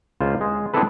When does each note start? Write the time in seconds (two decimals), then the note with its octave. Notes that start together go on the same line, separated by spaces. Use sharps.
0.21 C#2 F4 C5
0.41 G#3
0.74 B3 C4 D4 E4 A4 B4